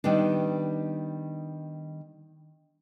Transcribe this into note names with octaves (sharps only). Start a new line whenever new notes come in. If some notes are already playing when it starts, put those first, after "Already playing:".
D#3 G3 B3 D4